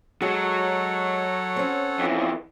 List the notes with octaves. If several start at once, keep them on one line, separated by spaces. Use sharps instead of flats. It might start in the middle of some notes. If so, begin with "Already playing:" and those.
F#3 G#3 A4 C#5 F#5
C4 C#4
F2 E3